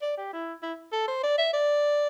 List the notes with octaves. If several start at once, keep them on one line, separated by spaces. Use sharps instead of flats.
D5
G4
E4
E4
A4
C5
D5
E5
D5